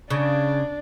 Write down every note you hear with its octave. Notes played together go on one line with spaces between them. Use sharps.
C#3 D4